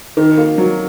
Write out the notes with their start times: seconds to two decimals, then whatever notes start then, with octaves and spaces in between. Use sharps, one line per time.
0.17 D#3
0.38 A#3
0.58 F#3